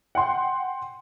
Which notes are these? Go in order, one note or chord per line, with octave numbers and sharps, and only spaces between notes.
F#5 G5 C6